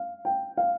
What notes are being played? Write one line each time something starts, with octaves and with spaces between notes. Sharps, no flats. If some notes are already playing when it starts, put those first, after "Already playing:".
Already playing: F5
G5
F5